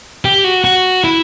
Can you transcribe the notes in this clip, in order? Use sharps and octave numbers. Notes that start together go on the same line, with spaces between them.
G4
F#4
F#4
E4